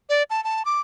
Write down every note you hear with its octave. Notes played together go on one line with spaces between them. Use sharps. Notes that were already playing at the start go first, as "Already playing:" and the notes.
D5
A5
A5
D6